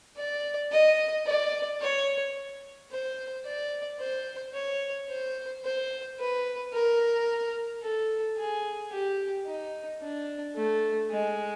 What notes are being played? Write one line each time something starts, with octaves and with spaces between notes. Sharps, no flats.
D5
D#5
D5
C#5
C5
D5
C5
C#5
C5
C5
B4
A#4
A4
G#4
G4
D#4
D4
A3
G#3